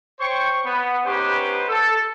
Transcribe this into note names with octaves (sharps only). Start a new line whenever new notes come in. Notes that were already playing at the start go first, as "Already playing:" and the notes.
C5 C#5 G5 C#6
B3
B3 C#4 D#4 G4 B4 C5
A4